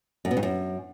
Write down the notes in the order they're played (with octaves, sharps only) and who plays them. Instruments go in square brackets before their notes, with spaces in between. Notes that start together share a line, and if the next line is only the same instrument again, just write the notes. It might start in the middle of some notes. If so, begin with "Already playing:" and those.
[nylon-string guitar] F#2
B2
G2
F#2